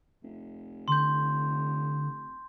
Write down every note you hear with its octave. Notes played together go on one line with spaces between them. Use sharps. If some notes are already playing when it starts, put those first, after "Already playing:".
F1
D3 C6 G6